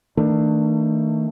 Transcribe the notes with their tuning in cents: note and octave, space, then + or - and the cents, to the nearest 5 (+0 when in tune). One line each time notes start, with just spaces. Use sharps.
D#3 +40 A3 +35 D4 +20